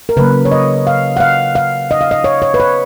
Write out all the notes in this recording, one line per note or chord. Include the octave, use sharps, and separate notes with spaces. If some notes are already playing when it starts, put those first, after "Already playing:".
A#4
C#3 F#3 A#3 B4
C#5
D#5
F5
F#5
F5
F5
D#5
F5
D#5
C#5
C#5
B4
C#5